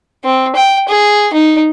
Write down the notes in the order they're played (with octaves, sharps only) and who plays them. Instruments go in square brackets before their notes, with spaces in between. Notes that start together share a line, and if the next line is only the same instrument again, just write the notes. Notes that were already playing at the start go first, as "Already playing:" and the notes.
[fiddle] C4
G5
G#4
D#4